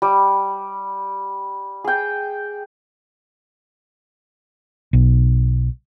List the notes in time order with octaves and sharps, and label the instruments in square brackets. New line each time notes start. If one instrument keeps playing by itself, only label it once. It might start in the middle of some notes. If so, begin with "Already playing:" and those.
[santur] G3
G#4 G5
[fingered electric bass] B1